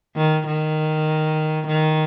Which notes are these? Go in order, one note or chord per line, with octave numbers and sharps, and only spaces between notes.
D#3
D#3
D#3